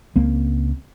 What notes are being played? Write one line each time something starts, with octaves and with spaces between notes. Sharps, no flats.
C#2 A#3 C4